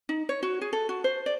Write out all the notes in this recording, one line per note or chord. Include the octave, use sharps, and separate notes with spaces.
D#4
C#5
F#4
G#4
A4
F#4
C5
D5